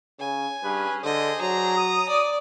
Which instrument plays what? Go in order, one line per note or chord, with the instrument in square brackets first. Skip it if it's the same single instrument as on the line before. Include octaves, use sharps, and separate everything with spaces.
[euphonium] C#3 [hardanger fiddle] G#5
[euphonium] G2 [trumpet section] C#4 G#4 B4
[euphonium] D3 [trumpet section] D4 G#4 C5 [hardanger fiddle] D#5
[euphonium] F#3 [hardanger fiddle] A#5
[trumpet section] D#6
[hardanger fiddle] D5